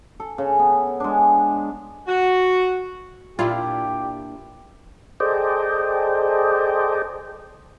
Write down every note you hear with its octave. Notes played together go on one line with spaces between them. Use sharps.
A4
C#3
B3
G#3 D4
F#4
A#2 D4 E4 F4 G4
G#4 A4 C5 D5 D#5 G5